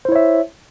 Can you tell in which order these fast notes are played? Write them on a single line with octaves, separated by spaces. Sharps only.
C5 E4 C#5 E5